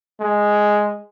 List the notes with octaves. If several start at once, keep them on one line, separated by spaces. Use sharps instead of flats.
G#3